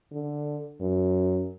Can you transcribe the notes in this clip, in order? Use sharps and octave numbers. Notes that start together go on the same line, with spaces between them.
D3
F#2